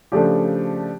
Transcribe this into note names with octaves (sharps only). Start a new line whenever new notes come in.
C#3 F3 A3 D4 G4